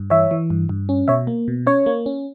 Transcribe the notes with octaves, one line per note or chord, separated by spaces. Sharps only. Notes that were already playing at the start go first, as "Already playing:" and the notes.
Already playing: G2
E3 C#5 E5
E3
G2
G2
C#4
B2 C#5 E5
A#3
B2
C#4 C#5
A#3
C#4